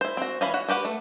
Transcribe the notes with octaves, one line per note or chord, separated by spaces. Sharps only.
E4 C5
C4 F#4
E3 C#4 F5 B5
F#4 F#5
F#4 G4 B4 F#5
A3